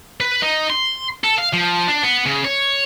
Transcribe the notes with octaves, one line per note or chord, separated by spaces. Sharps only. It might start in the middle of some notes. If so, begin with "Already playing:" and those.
B4
D#4
C6
A4
F5
F3
D4
B3
C#3
C#5